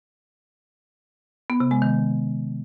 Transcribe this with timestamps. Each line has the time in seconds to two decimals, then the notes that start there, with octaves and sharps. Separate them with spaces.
1.50 B3
1.60 C3
1.71 G#3
1.82 D#3